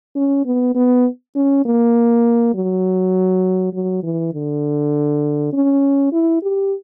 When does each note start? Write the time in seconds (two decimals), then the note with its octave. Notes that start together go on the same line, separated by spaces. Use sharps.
0.16 C#4
0.45 B3
0.75 B3
1.35 C#4
1.65 A#3
2.54 F#3
3.73 F#3
4.03 E3
4.34 D3
5.53 C#4
6.12 E4
6.42 G4